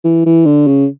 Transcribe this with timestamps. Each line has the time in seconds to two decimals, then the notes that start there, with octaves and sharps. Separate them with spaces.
0.04 E3
0.26 E3
0.46 D3
0.67 C#3